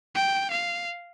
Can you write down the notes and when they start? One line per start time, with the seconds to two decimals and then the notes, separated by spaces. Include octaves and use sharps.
0.15 G5
0.50 F5